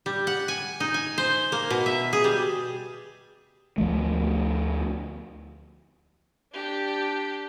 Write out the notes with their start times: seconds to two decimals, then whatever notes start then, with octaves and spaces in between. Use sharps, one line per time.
0.06 G3
0.27 F#5
0.48 G#5
0.80 D#4
0.94 G#5
1.18 C5
1.52 A#3
1.70 B2
1.86 E5
2.13 G#4
2.24 G3
3.78 D2 F3 A3
6.53 D4 G4